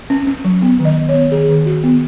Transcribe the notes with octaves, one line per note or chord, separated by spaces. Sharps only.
C#4
C#4
F#3
B3
D#3
D#5
B3
C#5
B3
D#3 G#4
D#3
D#3 F#4
B3